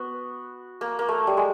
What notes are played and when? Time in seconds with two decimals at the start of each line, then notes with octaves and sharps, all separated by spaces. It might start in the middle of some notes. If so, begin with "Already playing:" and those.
Already playing: B3 F#4
0.81 A#3
0.99 A#3
1.08 A3
1.27 G3
1.37 G#3